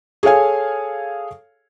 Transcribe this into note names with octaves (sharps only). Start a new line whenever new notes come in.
G#4 A4 C#5 F5 G#5